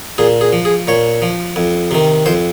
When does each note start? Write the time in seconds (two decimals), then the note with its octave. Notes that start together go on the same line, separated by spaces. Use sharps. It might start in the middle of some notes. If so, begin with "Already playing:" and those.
0.18 A#2 G#4
0.41 G#4
0.53 F3
0.65 G#4
0.87 A#2 C#5
1.22 F3
1.56 F2
1.91 C3 D#3
2.26 F2 C5